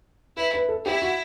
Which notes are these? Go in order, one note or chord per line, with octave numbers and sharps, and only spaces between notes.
E4 B4
B4
A4
E4 G4
F#4